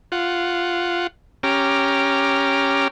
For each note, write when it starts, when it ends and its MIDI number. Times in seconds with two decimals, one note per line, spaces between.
0.12 1.07 65
0.12 1.07 78
1.43 2.88 61
1.43 2.88 67
1.43 2.88 82
1.43 2.88 86
1.43 2.88 89